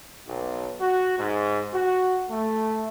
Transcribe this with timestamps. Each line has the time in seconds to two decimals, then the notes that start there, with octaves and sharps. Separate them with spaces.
0.28 B1
0.81 F#4
1.19 G#2
1.74 F#4
2.30 A3